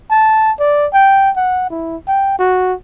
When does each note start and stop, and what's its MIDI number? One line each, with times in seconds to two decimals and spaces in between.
0.11 0.52 81
0.59 0.87 74
0.93 1.30 79
1.36 1.68 78
1.70 1.96 64
2.08 2.34 79
2.39 2.74 66